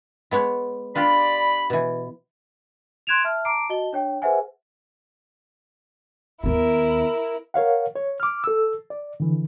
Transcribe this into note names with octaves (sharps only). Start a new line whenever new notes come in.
G#3 B3 C#5
D4 F4 G4 D5 B5
B2 E3
C6 F#6 G#6 D7 E7 F7
E5 A5 F6
A5 A#5 D6 C7 D7
F#4 D#5 A5 G7
D4 C#5 G5
G#4 B4 C5 E5 F#5 G#5
D#2 B3 E4 A#4
A#4 C#5 F5 F#5
C#5
D6 F6
A4 E6
D5
D3 E3